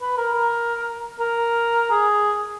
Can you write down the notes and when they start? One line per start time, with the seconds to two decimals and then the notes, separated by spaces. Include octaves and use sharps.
0.02 B4
0.17 A#4
0.33 A#4
1.20 A#4
1.91 G#4